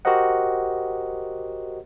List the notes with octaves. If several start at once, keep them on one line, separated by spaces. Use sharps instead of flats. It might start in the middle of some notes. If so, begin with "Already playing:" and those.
F#4 G4 A#4 C5 D#5 F#5